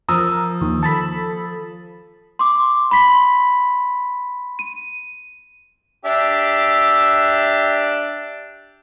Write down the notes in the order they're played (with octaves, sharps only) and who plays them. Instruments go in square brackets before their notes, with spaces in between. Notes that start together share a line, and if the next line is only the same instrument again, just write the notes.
[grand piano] F3 D#6 E6 [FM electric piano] A#4
[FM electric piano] D#2
A4 A5 B5
[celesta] C6 D6
B5 C6 B6
D#7
[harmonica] D4 G4 E5